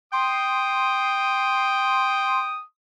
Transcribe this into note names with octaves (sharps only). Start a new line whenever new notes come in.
G5 C6 D#6